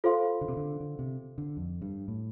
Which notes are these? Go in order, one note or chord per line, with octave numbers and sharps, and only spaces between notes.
F4 A4 C5 F5 C6
D3
C3
D3
D3
C3
D3
F2
G2
A2